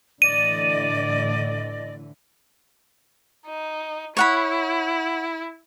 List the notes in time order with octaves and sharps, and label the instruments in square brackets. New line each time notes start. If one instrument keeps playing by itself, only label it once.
[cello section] A2 D3 E3 [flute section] D5 D#5 [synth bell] D#7
[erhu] D#4
[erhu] E4 [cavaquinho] C#5 F#5 B5